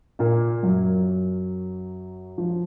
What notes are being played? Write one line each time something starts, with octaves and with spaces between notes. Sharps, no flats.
A#2 A#3
F#2 F#3
F3